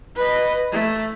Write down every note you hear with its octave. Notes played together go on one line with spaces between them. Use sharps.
B4 D#5
A3